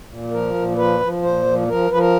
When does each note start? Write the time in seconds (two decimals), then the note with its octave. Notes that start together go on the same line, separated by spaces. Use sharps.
0.09 A#2
0.31 F3 A#4
0.54 A#2
0.77 F3 B4
1.00 F3
1.23 A#2 C5
1.45 F3
1.68 F3 A#4
1.91 F3 B4
1.97 A#4